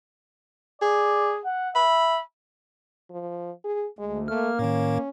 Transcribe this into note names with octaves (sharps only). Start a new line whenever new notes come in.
G#4 D5
F#5
E5 B5
F3
G#4
D2 G#3
A3 A#3 F6
A2 D#3 C#4